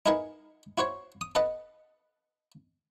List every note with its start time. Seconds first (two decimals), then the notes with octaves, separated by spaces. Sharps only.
0.06 D#4 E4 G#4 A#4 B4 F#5
0.78 E4 F#4 C5 C#5
1.21 D#6
1.35 A4 B4 D#5 F#5